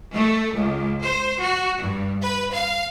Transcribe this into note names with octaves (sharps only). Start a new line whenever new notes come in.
A3
C#2
C5
F#4
G2
B4
F5